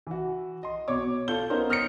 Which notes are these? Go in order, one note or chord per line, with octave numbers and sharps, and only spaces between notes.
E3 F#4
D#5 C6
B2 C#5 D6
F4 A4 F5 G6 G7
B3 C#4 D#4 A#4 C5
D#6 F6 G6 A#6 B6 C#7